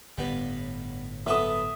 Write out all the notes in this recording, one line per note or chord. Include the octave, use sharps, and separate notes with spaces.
G1 A2 G3 B3
F#3 B3 A4 E5 D#6